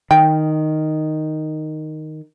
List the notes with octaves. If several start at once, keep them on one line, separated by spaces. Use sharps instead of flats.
D#3 G5